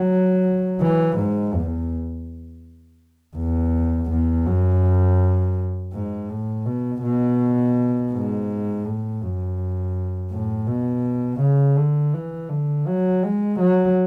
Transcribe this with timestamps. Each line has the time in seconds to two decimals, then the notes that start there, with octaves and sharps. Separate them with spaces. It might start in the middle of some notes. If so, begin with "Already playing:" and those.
Already playing: F#3
0.81 E3
1.17 G#2
1.55 E2
3.37 E2
4.11 E2
4.46 F#2
5.93 G#2
6.29 A2
6.66 B2
7.03 B2
8.12 G#2
8.85 A2
9.22 F#2
10.31 A2
10.67 B2
11.40 C#3
11.76 D3
12.14 E3
12.49 D3
12.87 F#3
13.23 G#3
13.60 F#3